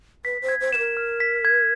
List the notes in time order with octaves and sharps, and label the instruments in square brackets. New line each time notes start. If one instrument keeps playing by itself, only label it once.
[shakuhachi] B4 [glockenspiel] B6
[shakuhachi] C5
[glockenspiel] G#6
[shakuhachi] C5
[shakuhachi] B4 [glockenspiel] E7
[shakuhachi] A#4
[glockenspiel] F6
B6
G#6